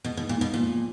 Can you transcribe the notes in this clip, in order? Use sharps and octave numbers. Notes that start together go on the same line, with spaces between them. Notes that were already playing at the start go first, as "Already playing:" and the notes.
B2 G#3
B2
G#2
A#2
G#2 B2
A#2 F3